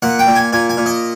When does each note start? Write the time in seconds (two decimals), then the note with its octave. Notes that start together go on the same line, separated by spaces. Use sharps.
0.02 A#2 F#5
0.19 G5
0.27 A#2
0.36 G#5
0.53 A#2 G#5
0.70 G#5
0.77 A#2
0.86 D#5